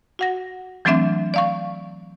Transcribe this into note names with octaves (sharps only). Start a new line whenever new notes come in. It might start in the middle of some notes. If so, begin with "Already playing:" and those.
F#4 F#5 A#6
E3 F#3 A3 C4 D4 E5
D5 F5 C#6